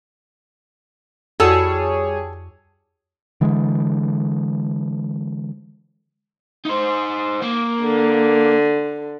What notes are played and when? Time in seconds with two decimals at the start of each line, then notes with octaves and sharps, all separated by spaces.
1.40 F2 G3 F#4 G#4 A4 C#5 E6
3.41 D3 E3 G#3
6.65 D#4 C5
7.42 A#3
7.83 D3